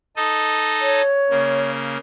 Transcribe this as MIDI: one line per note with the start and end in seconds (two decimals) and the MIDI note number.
0.16 1.02 63
0.16 1.02 69
0.16 1.02 75
0.81 1.71 73
1.30 1.97 49
1.30 1.97 58